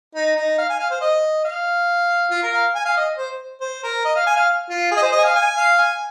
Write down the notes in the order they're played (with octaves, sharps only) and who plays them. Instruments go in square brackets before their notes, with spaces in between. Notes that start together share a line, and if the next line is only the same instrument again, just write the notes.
[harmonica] D#4
D#4
F5
G#5
F5
C5
D#5
F5
F4
A#4
F5
G#5
F5
D#5
C5
C5
A#4
D#5
F5
G#5
F5
F4
G#4
D#5
C5
D#5
G#5
F5
G#5
F5
G#5